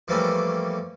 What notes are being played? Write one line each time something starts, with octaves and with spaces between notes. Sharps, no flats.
F2 E3 G3 A3 A#3 C#4